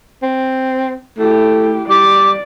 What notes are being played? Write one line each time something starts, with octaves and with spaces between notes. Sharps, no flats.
C4
A3 E4 G4
G3 D5 D6